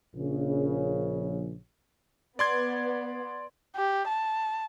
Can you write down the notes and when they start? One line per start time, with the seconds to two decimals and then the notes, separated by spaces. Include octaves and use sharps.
0.15 A#1 C#3
2.39 B3 D5 C6 G#6
3.76 G4
4.08 A5